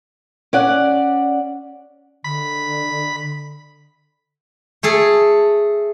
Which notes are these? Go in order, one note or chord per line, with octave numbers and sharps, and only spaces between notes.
C#4 D5 F#5
D3 B5
A3 G#4 A4